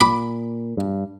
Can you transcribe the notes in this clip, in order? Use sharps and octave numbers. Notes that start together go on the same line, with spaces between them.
A#2 B5 D6
G2